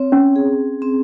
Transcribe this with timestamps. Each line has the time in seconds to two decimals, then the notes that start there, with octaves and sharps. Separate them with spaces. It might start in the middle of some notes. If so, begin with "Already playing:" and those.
Already playing: C4 C#5
0.12 C#4
0.36 G#4
0.82 C4